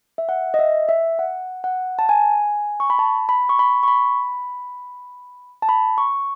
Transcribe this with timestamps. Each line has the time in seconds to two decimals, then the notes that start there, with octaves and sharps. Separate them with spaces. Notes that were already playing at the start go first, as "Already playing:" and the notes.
0.18 E5
0.29 F#5
0.54 D#5
0.59 E5
0.89 E5
1.19 F#5
1.64 F#5
1.99 A5
2.09 G#5
2.80 C#6
2.90 B5
2.99 A5
3.29 B5
3.49 C#6
3.59 B5
3.83 C#6
3.88 B5
5.62 A5
5.69 B5
5.98 C#6